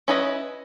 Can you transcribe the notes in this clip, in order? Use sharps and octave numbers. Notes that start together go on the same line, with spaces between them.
C#4 E4 B4 D#5